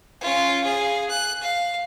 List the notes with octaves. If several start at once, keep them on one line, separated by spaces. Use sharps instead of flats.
C#4 F4
G#4 F5
F#6
F5